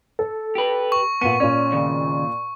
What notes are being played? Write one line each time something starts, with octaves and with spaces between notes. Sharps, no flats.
A4
G4 B4
C#6
A#2 B3 D#7
A#2 C#4 D5
D#2 C#3